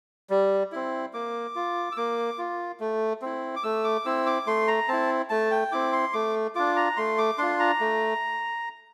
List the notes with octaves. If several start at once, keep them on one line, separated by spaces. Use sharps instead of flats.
G3
C4 E4
A#3 D6
F4
E6
A#3 D6
F4
A3
C4 E4
D6
A3 E6
D6
C4 E4 E6
D6
A3 C6
A#5
C4 E4 A5
A3 A5
G5
C4 E4 D6
C6
A3 D6
D4 F4 D6
A#5
A3 C6
D6
D4 F4 C6
A#5
A3